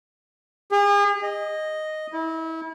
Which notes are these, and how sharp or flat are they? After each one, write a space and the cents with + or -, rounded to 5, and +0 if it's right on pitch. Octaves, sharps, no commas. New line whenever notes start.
G#4 -40
D#5 -5
E4 -30